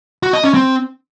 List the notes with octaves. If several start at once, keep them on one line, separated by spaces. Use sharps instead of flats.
F#4
D#5
C#4
C4